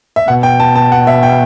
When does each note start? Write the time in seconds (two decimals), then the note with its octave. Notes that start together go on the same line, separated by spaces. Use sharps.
0.16 E5
0.27 B2 F#5
0.43 G5
0.60 A5
0.75 A5
0.92 F#5
1.07 E5
1.23 G5